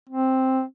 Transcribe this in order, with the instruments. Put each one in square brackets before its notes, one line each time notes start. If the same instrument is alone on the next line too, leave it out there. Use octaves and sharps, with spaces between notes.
[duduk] C4